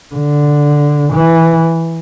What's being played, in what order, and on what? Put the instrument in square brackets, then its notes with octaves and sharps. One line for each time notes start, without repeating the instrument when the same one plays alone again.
[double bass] D3
E3